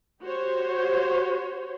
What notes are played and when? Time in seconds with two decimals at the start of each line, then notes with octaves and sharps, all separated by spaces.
0.21 F#4 G4 C5 C#5